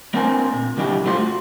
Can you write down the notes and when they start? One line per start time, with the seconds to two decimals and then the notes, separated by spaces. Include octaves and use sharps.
0.14 A#3 C4 D4 A#4 C5 G#5
0.54 A#2
0.77 C#3 F#3 D4 E4 G4
1.04 C2 G#2 A3 F4 C5 C6
1.17 F#4